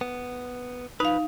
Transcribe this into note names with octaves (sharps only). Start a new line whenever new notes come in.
B3
F3 D#4 B4 F5